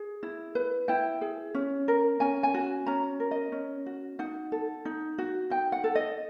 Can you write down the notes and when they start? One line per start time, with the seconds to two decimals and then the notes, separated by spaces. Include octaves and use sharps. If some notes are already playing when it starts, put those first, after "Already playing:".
Already playing: G#4
0.23 E4
0.55 B4
0.88 E4 G5
1.21 G#4
1.54 C#4
1.88 A#4
2.20 C#4 G#5
2.43 G#5
2.54 F#4
2.86 C#4 A#5
3.20 A#4
3.31 D#5
3.52 C#4
3.86 F#4
4.19 D#4 F#5
4.52 A4
4.85 D#4
5.18 F#4
5.50 D#4 G5
5.72 F#5
5.84 A4
5.95 D#5